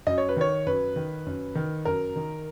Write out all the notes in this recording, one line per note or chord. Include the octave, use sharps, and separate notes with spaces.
F#2 D#5
C#5
B4
D#3 C#5
F#2 B4
D#3
F#2
D#3
F#2 A#4
D#3